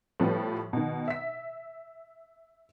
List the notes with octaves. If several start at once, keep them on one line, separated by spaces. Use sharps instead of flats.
A2 F3 G3 B3
B2 D#3
E5 B6